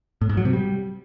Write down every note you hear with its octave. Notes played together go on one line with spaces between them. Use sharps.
A2
G#2
F#3
C3
G3